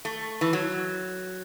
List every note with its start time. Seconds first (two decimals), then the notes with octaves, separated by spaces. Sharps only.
0.05 A3
0.41 E3
0.53 F#3